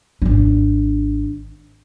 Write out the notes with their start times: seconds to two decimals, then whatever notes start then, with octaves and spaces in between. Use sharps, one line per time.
0.22 G#1 D4